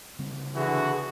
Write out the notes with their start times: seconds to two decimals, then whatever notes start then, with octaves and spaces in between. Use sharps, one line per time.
0.19 C#3 G3 C4
0.55 D3 E3 F#4 G#4